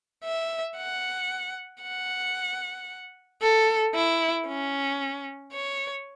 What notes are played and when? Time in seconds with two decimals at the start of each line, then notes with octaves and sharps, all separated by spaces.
0.24 E5
0.77 F#5
1.83 F#5
3.42 A4
3.95 E4
4.48 C#4
5.53 C#5